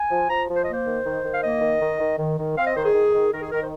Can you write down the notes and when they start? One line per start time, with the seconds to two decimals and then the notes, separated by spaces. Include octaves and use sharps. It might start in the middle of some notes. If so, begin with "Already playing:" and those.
Already playing: G#5
0.10 F3
0.29 F3 A#5
0.48 F3
0.55 C5
0.63 D#5
0.67 A#3 C5
0.86 D#3
1.04 D#3
1.23 D#3
1.32 F5
1.43 A#3 D#5
1.61 D#3
1.81 D#3
1.99 D#3
2.18 D#3
2.38 D#3
2.57 C4 F5
2.65 D#5
2.76 D#3 C5
2.84 G#4
2.94 D#3
3.13 D#3
3.32 D#3 A#4
3.41 G#4
3.51 D#3 A#4
3.61 C5